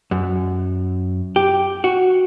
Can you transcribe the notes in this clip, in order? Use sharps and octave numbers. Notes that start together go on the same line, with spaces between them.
F#2
G4
F#4